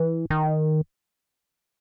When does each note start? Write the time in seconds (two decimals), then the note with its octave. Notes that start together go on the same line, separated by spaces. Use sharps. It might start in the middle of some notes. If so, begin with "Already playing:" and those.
Already playing: E3
0.30 D#3